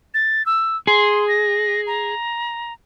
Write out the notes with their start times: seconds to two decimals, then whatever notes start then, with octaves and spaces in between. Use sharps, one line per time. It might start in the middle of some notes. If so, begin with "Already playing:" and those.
0.14 A6
0.46 E6
0.87 G#4 C6
1.28 A#6
1.87 A#5